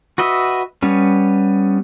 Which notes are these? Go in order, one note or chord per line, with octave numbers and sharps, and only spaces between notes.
F#4 B4 D#5 E5
G3 B3 C#4